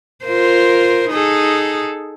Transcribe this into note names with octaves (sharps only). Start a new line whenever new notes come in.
F4 A#4 C5
D#4 G#4 A4